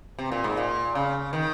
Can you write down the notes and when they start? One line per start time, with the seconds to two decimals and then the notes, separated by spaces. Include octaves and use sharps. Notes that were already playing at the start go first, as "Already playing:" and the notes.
0.19 C3
0.32 A#2
0.44 G#2
0.57 A#2
0.95 C#3
1.33 D#3